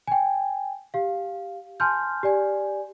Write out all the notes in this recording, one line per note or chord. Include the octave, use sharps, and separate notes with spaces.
G5 G#5
G4 F5
G#5 A5 C6 F6 G6
G4 D5 G#5